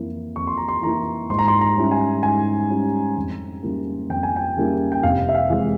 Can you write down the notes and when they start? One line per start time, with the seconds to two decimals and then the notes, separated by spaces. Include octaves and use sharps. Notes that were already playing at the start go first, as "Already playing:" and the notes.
Already playing: F2 E3 A#3 E4
0.36 F2 C#6
0.47 C6
0.57 A#5
0.68 C6
0.82 E3 A#3 E4 A#5
1.30 G#2 C6
1.39 A#5
1.48 C6
1.61 A#5
1.77 G3 C#4 E4
1.91 G#5
2.23 G#2 G#5
2.70 G3 C#4 E4
3.17 F2
3.63 C#3 G3 A#3 E4
4.10 F2 G5
4.23 G#5
4.36 G5
4.57 C#3 G3 A#3 E4
4.92 G5
5.03 F1 F5
5.29 E5
5.35 F5
5.50 F2 E3 G#3